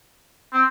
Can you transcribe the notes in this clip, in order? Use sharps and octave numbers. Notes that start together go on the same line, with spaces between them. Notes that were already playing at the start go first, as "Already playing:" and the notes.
C4